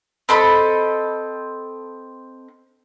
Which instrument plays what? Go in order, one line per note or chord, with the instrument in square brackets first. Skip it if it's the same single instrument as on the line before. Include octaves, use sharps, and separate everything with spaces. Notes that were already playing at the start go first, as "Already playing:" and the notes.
[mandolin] C4 A4 D#5 B5